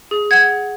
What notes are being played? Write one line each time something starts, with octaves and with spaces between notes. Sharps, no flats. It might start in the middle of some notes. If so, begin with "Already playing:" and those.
G#4
F#5 G#6
G#4